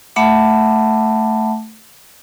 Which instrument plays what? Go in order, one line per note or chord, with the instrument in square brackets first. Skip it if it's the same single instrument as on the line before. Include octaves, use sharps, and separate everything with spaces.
[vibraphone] A3 E5 F#5 A5 B5 D6